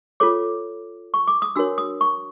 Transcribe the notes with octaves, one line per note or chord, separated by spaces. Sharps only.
F4 A4 C#5 D6
C#6
D6
D#6
D4 F#4 A#4 C#5 E6
D#6
C#6